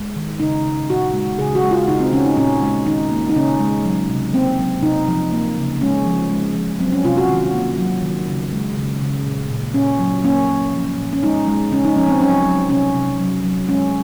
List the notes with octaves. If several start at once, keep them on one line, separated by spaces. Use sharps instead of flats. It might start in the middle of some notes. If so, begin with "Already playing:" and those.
Already playing: G#3
D#3
C#3 D#4
C#3
A#2 F#4
G#3
C#3 G#4
F#4
G#3
F4
C#3 D#4
C4
C#3 C#4
D#4
A#2 C#4
G#3
D#3 D#4
A#3
D#4
C#3 C#4
G#3
F#3
C3
A#3 C4
F#3
C3 D#4
F3
A#3
C#3
G#3 C#4
F3
G#3
F3
F#3 C4
C#4
C3 F4
F#4
D#3
A#3
F#3
D#3
C#3
G#3
C#3
C#3
A#2
A#2
A#2 C#4
F#3
A#3 C#4
A#3
F3
A#2
C#4
G#3 D#4
G#3
C#3 C#4
D#4
F3 C#4
C4
F#3 C#4
F#3
C3 C#4
C3
F#3
F#3
G#3 C#4